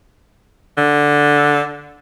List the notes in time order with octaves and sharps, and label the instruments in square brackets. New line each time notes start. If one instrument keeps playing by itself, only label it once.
[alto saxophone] D3